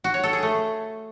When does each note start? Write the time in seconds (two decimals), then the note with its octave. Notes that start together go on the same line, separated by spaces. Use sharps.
0.04 F#4
0.14 C#5
0.23 A4
0.33 G#4
0.43 A3